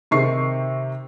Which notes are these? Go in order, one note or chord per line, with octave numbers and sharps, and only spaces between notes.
C3 D#3 C#6 C7